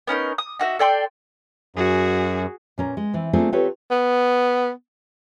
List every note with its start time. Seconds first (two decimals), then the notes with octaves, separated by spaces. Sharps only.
0.07 B3 C#4 D#4 A#4
0.38 D#6
0.59 D#4 F#4 E5
0.79 A4 D5 G5 C6
1.76 F#2 F#4 G#4
2.78 A#2 C#4 A#4
2.97 G#3
3.13 E3 C4
3.33 A3 A#3 C4 D4 F4 G#4
3.52 C4 F4 G4 A4 B4 C#5
3.91 B3